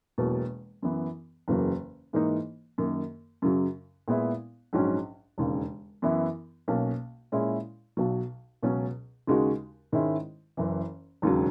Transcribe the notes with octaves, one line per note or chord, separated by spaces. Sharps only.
E1 E2 B2 F#3 A#3
F#2 E3 B3
F#1 E2 C#3 F#3 A#3
G#2 E3 A#3 D#4
F#2 D#3 A#3
F#2 C#3 F#3
A#2 G#3 B3 E4
A#1 G#2 F#3 C#4
E1 D#2 C#3
F#2 E3 B3 E4
B1 B2 A#3 C#4
A#2 G#3 C#4 E4
B1 B2 F#3
C#2 B2 F#3 C#4
D#2 C#3 G#3 D#4 F#4
G#2 D#3 G#3 C#4 E4
F#1 F#2 E3
E1 D#2 C#3 F#3